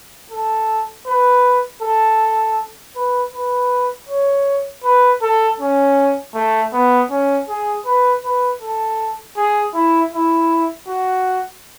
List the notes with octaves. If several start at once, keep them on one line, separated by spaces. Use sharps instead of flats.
A4
B4
A4
B4
B4
C#5
B4
A4
C#4
A3
B3
C#4
G#4
B4
B4
A4
G#4
E4
E4
F#4